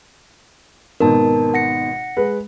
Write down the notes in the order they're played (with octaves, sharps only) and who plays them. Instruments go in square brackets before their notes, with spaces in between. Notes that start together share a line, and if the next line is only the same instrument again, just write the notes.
[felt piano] G#1 B2 D#3 [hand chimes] A#4 A5
[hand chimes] F#5 A#6 C#7
[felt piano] G#3 B4